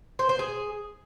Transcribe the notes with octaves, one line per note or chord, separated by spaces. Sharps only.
C5
C5
G#4